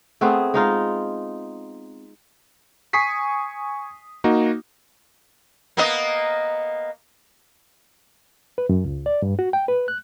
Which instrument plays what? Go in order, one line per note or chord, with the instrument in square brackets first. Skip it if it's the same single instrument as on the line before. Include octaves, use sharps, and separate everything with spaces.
[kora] A3 B3 C4 G#4
G#3 D#4 F4
[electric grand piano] G#5 C#6 D#6 B6 C7
A#3 D#4 F#4
[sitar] A#3 B3 D#5
[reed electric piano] B4
F#2
C#2
D5
G2
F#4
G5
B4
F#6